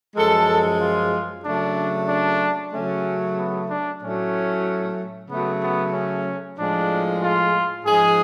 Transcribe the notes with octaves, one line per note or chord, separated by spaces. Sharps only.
F#2 F3 G#3 A4
F4
C#3 F#3 A3 D4
D4
C#3 F#3 A3 C#4
B3
D4
A2 F#3 A3 C#4
C#3 F#3 A3 B3
B3
C#4
A2 F3 G#3 D4
F4
G#2 F3 G#3 G#4